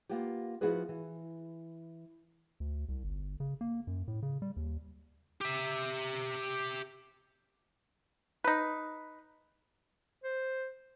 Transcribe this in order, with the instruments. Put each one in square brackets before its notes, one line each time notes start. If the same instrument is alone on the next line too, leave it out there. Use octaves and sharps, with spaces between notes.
[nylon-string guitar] A#3 B3 F4 G4
F3 B3 E4 F#4 G#4 B4
E3
[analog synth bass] D2
C2
G1
C#3
A#3
F#2
A2
C#3
G3
D#2
[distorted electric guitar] G4 E5
[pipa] D#4 B4
[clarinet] C5